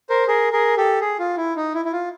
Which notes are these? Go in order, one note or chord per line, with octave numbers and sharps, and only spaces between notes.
A#4 C5
G#4 A#4
G#4 A#4
G4 A4
G#4
F4
E4
D#4
E4
E4
F4